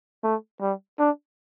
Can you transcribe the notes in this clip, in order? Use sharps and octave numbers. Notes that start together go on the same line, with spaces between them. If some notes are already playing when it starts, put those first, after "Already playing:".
A3
G3
D4